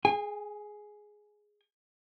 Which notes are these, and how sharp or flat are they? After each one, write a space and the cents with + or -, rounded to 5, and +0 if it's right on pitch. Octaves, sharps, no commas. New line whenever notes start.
G#4 +10 G#5 -35